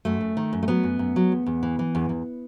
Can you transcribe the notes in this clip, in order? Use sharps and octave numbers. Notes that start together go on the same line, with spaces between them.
F#2 A3
F#2
D#3
F#2
A3
F#3 B3
F#2
F#2
F#3
E2
E2
E3
E3
E2
E2